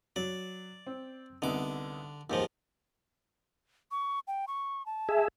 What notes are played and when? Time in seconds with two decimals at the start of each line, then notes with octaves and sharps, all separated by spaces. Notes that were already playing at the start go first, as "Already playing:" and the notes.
0.16 F#3 D5
0.86 C4
1.42 C2 D3 B3 D#4 D6
2.30 D#2 G#2 F3 G4
3.91 C#6
4.28 G5
4.48 C#6
4.86 A5
5.09 G#4 E5